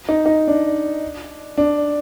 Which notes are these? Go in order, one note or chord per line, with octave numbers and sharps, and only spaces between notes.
D#4
D#4
D4
D4